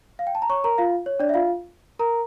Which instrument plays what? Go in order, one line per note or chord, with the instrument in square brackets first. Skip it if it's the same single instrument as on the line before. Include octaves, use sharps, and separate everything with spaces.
[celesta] F5
G5
A5
A#5
C#5 C#6
A#4 A#5
F4 F5
C#5
D4 D5
E5
F4 F5
A#4 A#5